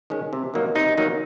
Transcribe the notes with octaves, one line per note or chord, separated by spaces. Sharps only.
D#3 G#3 C#4
C3
D#3 F#3 A#3 D#4
C3 D#4
D#3 F#3 A#3 D#4